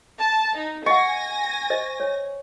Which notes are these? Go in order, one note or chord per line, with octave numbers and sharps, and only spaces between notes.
A5
D#4
D#5 F#5 G#5 C#6 A#6
C5 D#5
C#5